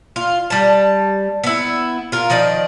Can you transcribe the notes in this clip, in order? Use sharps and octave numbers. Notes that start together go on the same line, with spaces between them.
F4
G3 A5
B3 E4
F4 A#4
D#3 F3 D5 D#5